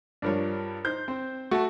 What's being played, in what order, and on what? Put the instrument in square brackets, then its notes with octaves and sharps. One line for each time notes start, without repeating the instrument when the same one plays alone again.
[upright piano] G2 F3 G3 [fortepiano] D4 A#4 C#5
[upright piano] D#4 G6 [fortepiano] C5
[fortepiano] C4 [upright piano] C5
[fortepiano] A3 A5 [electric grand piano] F#4